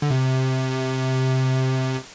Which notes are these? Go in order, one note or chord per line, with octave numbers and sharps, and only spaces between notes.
D3
C3